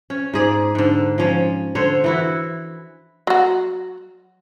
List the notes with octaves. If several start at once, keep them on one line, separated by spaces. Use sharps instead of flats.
C#4
G#2 G#4 D5
G#2 D3
F3 C#4
D3 C5 C#5
E3 E4 F#4
F#3 F#4